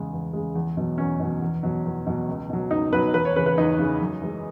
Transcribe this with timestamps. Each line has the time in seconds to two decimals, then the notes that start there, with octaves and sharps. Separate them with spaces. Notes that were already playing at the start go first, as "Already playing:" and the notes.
Already playing: E2 C#3 G#3
0.13 E2
0.33 C#3 G#3
0.55 E2
0.77 B2 F#3
0.98 E2 C#4
1.20 B2 F#3
1.42 E2
1.63 B2 F#3
1.85 E2
2.06 B2 F#3
2.28 C#2
2.50 B2 F#3
2.71 C#2 D#4
2.92 B2 F#3 B4
3.14 E2 B4
3.25 C#5
3.35 C#3 E3 B4
3.46 B4
3.58 E2 D#4
3.79 C#3 E3
4.01 F#2
4.22 E3 G#3